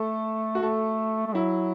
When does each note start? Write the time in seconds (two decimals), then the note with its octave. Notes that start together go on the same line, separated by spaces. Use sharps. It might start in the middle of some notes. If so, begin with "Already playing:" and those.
Already playing: A3 A4
0.55 F#4
0.62 A3 A4
1.27 A3
1.34 F#3 E4